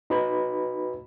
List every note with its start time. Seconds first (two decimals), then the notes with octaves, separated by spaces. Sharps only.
0.10 D#4 F#4 B4 B5